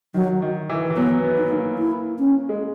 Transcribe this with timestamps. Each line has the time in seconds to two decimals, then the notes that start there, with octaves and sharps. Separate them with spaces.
0.14 D#3 F#3
0.42 D#3
0.70 E3
0.90 E3
0.96 F#3 B3
1.24 B3
1.37 D#4
1.51 A#3
1.78 E4
2.19 C#4
2.49 G#3